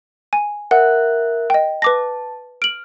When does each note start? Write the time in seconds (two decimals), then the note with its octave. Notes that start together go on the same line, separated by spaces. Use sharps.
0.33 G#5
0.71 A#4 E5 F#5 F#6
1.50 D#5 G5
1.82 B4 A5 D6 A#6
2.62 F6 D7 F#7